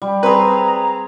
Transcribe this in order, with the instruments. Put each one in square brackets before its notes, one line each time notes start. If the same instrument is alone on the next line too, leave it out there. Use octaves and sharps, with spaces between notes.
[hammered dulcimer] G3
[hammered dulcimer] C4 G#4 [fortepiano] B4 [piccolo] A#5